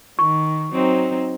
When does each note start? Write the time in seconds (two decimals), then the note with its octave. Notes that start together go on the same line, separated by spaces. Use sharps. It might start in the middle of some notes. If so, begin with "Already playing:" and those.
0.19 D#3 C#6
0.72 F#3 C4 D#4